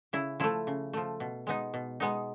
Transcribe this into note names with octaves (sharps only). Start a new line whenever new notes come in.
C#3 E4
F3 A3 E4
C#3
F3 A3
B2
G#3 B3 D#4
B2
G#3 B3 D#4